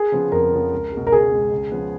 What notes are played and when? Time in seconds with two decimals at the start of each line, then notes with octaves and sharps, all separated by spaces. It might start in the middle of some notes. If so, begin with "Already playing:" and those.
Already playing: G#4
0.12 C#3 F3 B3
0.32 F2 A#4
0.52 C#3 F3 B3
0.72 C#2
0.92 B2 G#3
1.07 A#4
1.12 C#2 G#4
1.32 B2 G#3
1.52 C#2
1.72 C#3 F3 B3